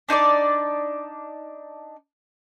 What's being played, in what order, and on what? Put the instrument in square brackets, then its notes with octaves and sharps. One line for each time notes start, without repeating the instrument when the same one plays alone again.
[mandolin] D4 D#4 C#5 D5